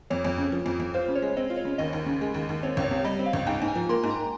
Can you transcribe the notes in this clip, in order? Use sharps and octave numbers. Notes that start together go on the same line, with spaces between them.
F2 C#5
F2
C#3
F3
F2
F2
F4 C5
C#3
C#5
G#3
C4 D#5
F4
C#5
C#3
D#2 D#5
D#2
C#3
G#3
D#2
D#2
C4 C#5
C#2
C#5
C3
G3 D#5
C4
F5
C#2
G#2 G5
G#2
G#5
F3
A#3 C6
G#2
A#5